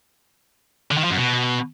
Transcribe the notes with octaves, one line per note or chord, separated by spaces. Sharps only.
D3
D#3
F3
F#2
B2